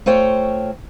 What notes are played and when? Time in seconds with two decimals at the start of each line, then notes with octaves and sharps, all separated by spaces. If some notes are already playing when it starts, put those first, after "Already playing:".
0.06 A3 F4 C5 C#5 G5